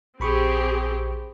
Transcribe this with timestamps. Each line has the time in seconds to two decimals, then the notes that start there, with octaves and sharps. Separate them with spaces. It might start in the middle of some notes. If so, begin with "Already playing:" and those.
0.20 A#1 C4 G4 G#4 B5 C#6